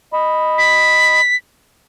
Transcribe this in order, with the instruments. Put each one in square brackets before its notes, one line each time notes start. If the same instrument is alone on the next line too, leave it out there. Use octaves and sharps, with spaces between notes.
[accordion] D#5 B5
[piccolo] B6